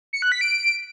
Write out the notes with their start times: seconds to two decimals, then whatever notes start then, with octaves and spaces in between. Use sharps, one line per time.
0.13 C#7
0.22 F#6
0.32 B6
0.41 D7